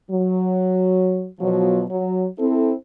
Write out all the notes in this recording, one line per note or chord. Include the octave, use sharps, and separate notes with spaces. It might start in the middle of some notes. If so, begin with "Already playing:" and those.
F#3
B2 F3 F#3
F#3
C4 E4 A4